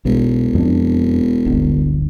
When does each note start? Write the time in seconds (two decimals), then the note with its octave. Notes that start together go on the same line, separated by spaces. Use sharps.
0.05 E1 B1
0.55 F2 D4
1.46 D1 G1 D3